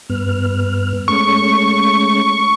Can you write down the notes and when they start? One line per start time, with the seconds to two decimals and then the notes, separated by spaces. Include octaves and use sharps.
0.10 G2 B3 F6
1.08 G#3 A3 C#4 C#6